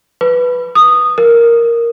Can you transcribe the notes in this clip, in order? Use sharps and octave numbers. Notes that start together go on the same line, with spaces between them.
B4
D#6
A#4